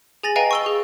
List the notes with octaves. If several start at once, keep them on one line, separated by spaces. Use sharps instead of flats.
G#4 G#5 A6 A#6 F#7
B4 D#5 F5 G5 G#5 A#5
C#6 E6 G7
G#4